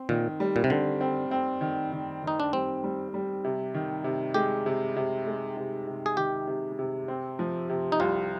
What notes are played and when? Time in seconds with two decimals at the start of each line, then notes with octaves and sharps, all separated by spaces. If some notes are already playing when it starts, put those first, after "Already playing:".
Already playing: C4
0.09 A#2 D#3
0.40 G3
0.56 A#2
0.64 C3
0.70 D3 C4
1.01 C4
1.31 C4
1.61 D#3
1.92 D#3
2.23 D#3 D#4
2.40 D4
2.53 G3 C4
2.84 G3
3.14 G3
3.44 C3
3.74 D#3
4.04 C3
4.34 G#3 G4
4.66 C3
4.96 C3
5.27 G#3
5.57 C3
5.87 C3
6.06 G#4
6.17 D#3 G4
6.47 C3
6.79 C3
7.08 C4
7.39 F3
7.69 C3
7.92 D#4
8.00 C2 F4